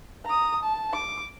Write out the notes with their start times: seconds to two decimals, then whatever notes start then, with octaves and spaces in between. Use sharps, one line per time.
0.25 A#5 D#6
0.62 A5
0.93 D6